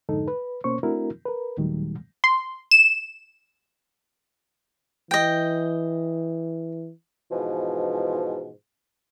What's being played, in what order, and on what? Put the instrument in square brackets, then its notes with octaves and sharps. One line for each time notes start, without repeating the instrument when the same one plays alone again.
[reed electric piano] F2 G#2 D3 D#4 A4
B4
B2 A#3 C#4 C5 C#6
A3 C4 D4 E4 F#4 A#4
A#4 B4
D#2 A#2 D#3 F#3 G3 A3
[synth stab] C6
E7
[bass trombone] E3 [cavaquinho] D#5 G5
[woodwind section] G#2 B2 E3 F3